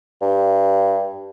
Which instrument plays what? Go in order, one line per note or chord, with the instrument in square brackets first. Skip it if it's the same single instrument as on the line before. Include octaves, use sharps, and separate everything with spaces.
[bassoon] G2